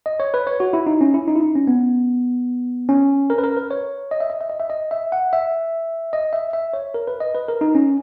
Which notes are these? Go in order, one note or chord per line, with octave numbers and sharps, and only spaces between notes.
D#5
C#5
B4
C#5
F#4
E4
D#4
C#4
E4
D#4
E4
D#4
C#4
B3
C#4
A#4
B4
A#4
B4
C#5
D#5
E5
D#5
E5
D#5
E5
D#5
E5
F#5
E5
D#5
E5
E5
C#5
A#4
B4
D#5
B4
A#4
D#4
C#4